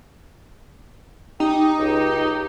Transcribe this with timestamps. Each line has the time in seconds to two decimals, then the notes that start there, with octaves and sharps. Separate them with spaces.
1.40 D#4 G4
1.79 C#2 G4